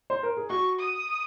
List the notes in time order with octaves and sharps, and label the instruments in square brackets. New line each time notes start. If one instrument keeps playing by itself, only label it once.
[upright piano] C5
A#4
G#4
[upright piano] F#4 [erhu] C#6
[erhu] D#6